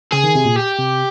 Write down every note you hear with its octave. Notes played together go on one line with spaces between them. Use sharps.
C#3 G#4
D#3
C3
A#2
G4
C3